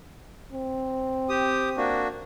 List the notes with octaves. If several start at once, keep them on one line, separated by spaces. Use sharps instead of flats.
C4
G4 D#6
A#3 D4 F#4